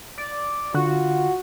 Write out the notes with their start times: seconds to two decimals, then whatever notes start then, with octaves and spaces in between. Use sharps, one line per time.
0.18 D5
0.74 D3 F4 F#4